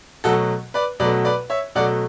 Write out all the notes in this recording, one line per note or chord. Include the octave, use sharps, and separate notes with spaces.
B2 F#3 A3 F#4 A4
B4 D5
B2 F#3 A3 B4 D5
B4 D5
C#5 E5
B2 F#3 A3 D5 F#5